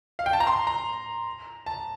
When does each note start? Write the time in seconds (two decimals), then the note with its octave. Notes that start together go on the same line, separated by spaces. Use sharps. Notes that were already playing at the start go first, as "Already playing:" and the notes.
0.19 F5
0.26 G5
0.33 A5
0.40 A#5
0.47 C6
0.67 A#5
1.66 A5